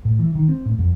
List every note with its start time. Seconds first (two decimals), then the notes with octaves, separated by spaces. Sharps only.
0.05 A2
0.19 E3
0.35 D#3
0.48 C4
0.66 A2
0.79 F2